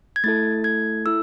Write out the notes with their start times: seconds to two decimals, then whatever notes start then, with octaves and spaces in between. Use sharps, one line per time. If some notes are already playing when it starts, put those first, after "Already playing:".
0.16 G#6
0.24 A3 E4 A4 A6
0.64 G#6
1.06 E4 A4 E6